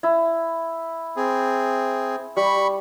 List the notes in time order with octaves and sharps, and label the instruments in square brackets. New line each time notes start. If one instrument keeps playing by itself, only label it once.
[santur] E4
[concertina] C4 G#4
[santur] G3 [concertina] B5 C#6